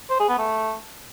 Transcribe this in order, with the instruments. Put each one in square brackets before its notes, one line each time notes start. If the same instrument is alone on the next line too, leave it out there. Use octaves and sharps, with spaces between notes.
[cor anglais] C5
G#4
B3
A3